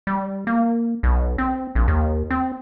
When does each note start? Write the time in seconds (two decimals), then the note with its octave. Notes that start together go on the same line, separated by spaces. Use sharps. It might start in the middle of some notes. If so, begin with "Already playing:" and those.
0.07 G3
0.47 A#3
1.03 B1
1.38 C4
1.75 A#1
1.88 D#2
2.30 C4